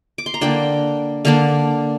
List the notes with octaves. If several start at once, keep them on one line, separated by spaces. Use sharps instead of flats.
D6
C6
A#5
D3 A#3 D4 G5
D3 A#3 D4 F5